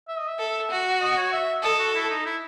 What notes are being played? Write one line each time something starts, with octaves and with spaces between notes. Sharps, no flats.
E5
D#5
E5
A4
F#4
D#5
C#5
E5
A4 D#5
F#4
E4
D#4
E4